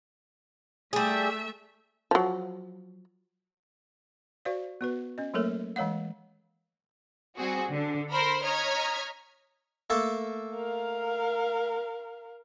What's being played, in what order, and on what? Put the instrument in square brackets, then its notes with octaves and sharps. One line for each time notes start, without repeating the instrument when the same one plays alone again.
[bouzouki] G3 G#4 [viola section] A3 E5
[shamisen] F3 F#3
[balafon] F#4 C5 D5 F5
B3 F#4 B4
C#4 D#5
F#3 A3 A#3 A4 A#4 C#5
E3 G#3 C#5 F5 F#5
[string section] G3 C4 F#4 G#4
D3
A#4 C5 B5
C#5 D#5 A#5 F6 G#6 B6
[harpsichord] A3 A#3 A4
[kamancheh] A#4 F5